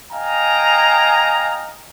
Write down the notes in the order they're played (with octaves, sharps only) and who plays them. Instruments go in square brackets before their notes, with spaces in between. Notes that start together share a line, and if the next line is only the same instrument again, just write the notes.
[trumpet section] D#5 F5 G5 G#5 A#5